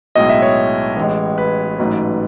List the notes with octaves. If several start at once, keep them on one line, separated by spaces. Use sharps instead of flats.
B1 A2 G#3 D#5
E5
C#5
A1 A2 G#3
B4
A1 G#2 F#3 A3